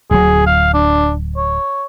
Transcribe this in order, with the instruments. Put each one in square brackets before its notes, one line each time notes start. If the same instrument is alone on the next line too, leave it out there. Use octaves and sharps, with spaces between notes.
[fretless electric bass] D1 F#3 [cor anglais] G#4
[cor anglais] F5
D4
C#5